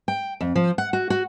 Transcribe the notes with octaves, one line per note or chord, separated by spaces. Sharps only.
G5
F2
F3
F#5
F#4
F#4